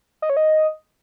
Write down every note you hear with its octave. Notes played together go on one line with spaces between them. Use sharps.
D#5
C#5
D#5